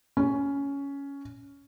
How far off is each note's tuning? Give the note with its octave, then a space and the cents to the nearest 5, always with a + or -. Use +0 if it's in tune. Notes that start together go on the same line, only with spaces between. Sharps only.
C#4 +10